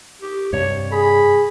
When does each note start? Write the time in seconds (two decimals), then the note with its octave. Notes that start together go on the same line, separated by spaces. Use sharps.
0.22 G4
0.53 G2 C3 C#5
0.92 G#4 B5